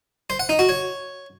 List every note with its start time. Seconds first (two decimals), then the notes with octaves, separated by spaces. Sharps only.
0.30 C5
0.40 F#5
0.49 D#4
0.59 F#4
0.69 C#5